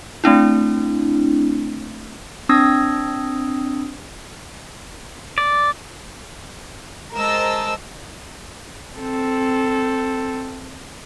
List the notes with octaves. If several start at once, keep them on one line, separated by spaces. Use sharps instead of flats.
A3 C4 D4 E4
C4 D4 D#6 E6 G#6 A#6
D5
G#3 A#4 C5 D#5 A5 E6
C4 A4